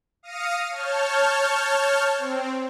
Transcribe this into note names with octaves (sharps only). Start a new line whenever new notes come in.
F5 D#6 F6 A#6 C#7 D#7
C#5 A5 F6 G6
C4